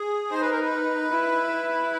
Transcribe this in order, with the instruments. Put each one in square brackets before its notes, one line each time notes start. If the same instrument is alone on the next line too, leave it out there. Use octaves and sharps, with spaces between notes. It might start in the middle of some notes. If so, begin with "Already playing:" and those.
Already playing: [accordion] G#4
[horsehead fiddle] D#4 [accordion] C5
[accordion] B4
A#4
B4
[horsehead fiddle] E4